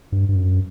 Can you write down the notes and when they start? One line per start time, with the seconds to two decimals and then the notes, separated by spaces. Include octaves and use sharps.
0.12 G2
0.29 G2
0.36 F#2